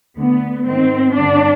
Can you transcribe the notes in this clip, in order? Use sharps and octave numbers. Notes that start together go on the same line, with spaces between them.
D2 D3 B3
G#2 D#3 C4
G2 D3 D4